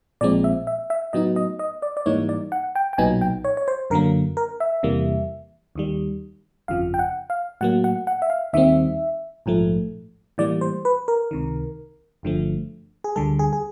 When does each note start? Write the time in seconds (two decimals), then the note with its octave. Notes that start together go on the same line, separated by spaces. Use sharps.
0.21 A#1 A#2 F3 G#3 C4 D5
0.44 E5
0.67 E5
0.90 E5
1.13 A2 F#3 B3 D#4 D#5
1.36 D#5
1.59 D#5
1.82 D5
1.97 D5
2.06 G#2 E3 G3 A#3 D#4 C#5
2.29 D5
2.52 F#5
2.75 G5
2.93 G5
2.98 B1 A#2 F#3 B3 D#4 G#5
3.21 G5
3.45 C#5
3.57 C#5
3.68 C5
3.90 F#2 D3 F#3 A#3 A#4
4.37 A#4
4.60 E5
4.83 E2 C3 E3 G3 A#3
5.75 D#2 D#3 G3
6.68 G1 F2 C#3 F3 F5
6.94 G5
6.99 F#5
7.30 F5
7.61 A2 F#3 A#3 F#5
7.84 F#5
8.07 F#5
8.22 E5
8.30 F5
8.53 D#2 D#3 G3 C4 E5
9.46 A#1 G#2 F3 A3
10.38 A2 E3 G3 A#3 D5
10.61 C5
10.85 B4
11.08 A#4
11.31 C#2 C3 D#3
12.23 G1 G2 D3 F3 A3
13.04 G#4
13.16 D2 D3 G3 A4
13.39 G#4
13.53 G#4